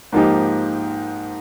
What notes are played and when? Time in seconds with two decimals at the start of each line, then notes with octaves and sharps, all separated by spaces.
0.12 G#2 F3 A#3 D#4 G4